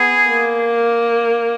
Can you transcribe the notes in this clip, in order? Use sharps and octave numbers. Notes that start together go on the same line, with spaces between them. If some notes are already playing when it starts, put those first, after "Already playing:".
Already playing: B3 G#4
A#3